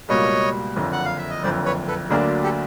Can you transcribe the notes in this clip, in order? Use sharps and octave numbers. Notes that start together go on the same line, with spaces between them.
C#2 B2 G3 A#3 C#5 D#5
F#1 F2 D3
F#5
F5
E5
D#5
F#1 F2 D3 C5 D5
B4 C#5
A4 B4
D2 D3 F#3 A#3 D4 G#4 A#4
G4 A4